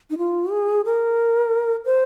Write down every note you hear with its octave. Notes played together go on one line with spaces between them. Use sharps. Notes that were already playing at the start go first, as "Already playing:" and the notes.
D#4
F4
G#4
A#4
C5